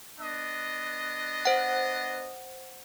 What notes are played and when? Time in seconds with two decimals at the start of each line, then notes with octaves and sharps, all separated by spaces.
0.18 B3 D4 D#5
1.45 C5 F#5